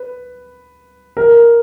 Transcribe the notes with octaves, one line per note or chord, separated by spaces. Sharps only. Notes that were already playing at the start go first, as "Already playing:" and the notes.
Already playing: B4
A#4